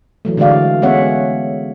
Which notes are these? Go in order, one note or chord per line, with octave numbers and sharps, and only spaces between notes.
E3 F#3 A3
D3 E3 G#3 F#4 D5 F5
G#3 B3 C#4 C#5 E5 F#5